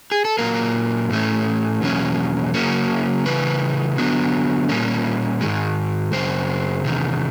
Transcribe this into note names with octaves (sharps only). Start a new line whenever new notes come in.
G#4
A4
A#2 F#3 A#3 A#4
A2 E3 A3 C#4
E2 B2 F#3 A#3 C#4
C#3 F#3 A#3 C#4
C#3 E3 G3 B4
D3 F#3 B3
A#2 G3 A#3 C#4
G#2 D#3 G#3
F#2 C#3 C5
E2 C3 D#3